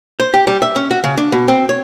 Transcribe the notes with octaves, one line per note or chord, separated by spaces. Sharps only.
C5
G4
G3
E5
C#4
F#4
C#3
D4
B2
C4
C#5